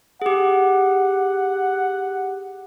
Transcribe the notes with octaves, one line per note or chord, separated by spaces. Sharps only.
G4 G#4 F#5